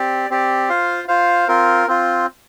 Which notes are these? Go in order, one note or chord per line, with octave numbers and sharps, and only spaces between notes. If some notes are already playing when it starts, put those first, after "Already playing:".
Already playing: C4 G4 D5
C4 G4 D5
F4 C5 F5
F4 C5 F5
C4 F4 A#4
C4 F4